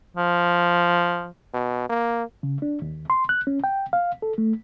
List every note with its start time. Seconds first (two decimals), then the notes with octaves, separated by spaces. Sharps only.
0.17 F3
1.54 B2
1.90 A#3
2.43 C#3
2.62 D4
2.82 D#2
3.10 C6
3.29 F#6
3.47 C#4
3.64 G5
3.93 F5
4.22 A4
4.38 A3